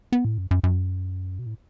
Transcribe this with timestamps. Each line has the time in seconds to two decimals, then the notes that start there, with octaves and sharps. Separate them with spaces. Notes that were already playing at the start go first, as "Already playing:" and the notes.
0.12 B3
0.25 A2
0.38 F#2
0.51 F#2
0.63 F#2
1.39 B2
1.46 A2